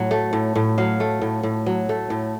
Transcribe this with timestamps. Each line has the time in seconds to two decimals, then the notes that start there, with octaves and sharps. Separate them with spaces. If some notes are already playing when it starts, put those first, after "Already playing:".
Already playing: A2 F#3
0.11 A3
0.33 A2
0.55 A2
0.78 F#3 F5
1.00 A3
1.22 A2
1.43 A2
1.66 F#3
1.89 A3
2.10 A2